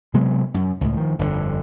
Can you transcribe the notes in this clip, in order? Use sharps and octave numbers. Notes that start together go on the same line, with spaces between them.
C3 F#3 G#3 B3
F#2
C#2 A2
D#3 F3
G1 F2 A2 D3